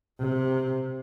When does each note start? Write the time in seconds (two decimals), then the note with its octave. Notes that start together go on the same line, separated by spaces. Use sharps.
0.20 C3